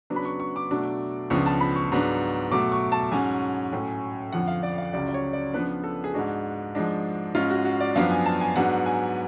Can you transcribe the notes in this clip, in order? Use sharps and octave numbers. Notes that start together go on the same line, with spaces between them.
C#3 F#3 B3 D4
B5
C#6
C#6
D6
B2 F#3 A3 D4
C#2 C#3 F3 B3 D4 C#6
A5
B5
C#6
G#2 F#3 B3 D4
B2 F#3 A3 D6
C#6
A5
G#2 F#3 C#4 G#5
A2 F#3 C#4
F2 D3 F3 F#5
F5
D5
F5
C#2 C#3 F#3 C#4 D5
D5
C#5
D5
C#3 F3 B3 D4 B4
A4
G#4
G#2 G#3 D4 F#4
G#2 F3 G#3 D4
G#2 G#3 C#4 F4
F#4
F#4
D5
F#2 F3 B3 D4 F5
G#5
A5
G#5
G#2 F#3 B3 D4 F#5
G#5